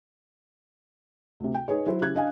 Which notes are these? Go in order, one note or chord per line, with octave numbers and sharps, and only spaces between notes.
D2 C3
G5
D#4 G#4 B4 C#5
F#3 E4 F#4 C5
C#3 E4 G4 F#6 G#6
D4 D#5 F5 G#5